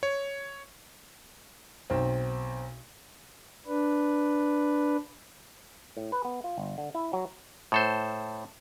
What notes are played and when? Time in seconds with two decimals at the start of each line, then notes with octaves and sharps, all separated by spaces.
0.03 C#5
1.90 B1 C4
3.67 D4 B4
5.97 A2
6.12 B4
6.25 B3
6.44 F4
6.58 G1
6.78 D3
6.95 E4
7.13 F#3
7.72 A2 A4 C5